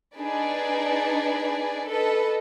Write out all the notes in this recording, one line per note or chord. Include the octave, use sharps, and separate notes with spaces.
D4 D#4 G#4 B4 D5
A4 B4 D#5